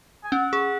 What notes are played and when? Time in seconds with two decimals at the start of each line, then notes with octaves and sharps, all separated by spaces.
0.24 G#5
0.32 C#4 F#5
0.53 G#4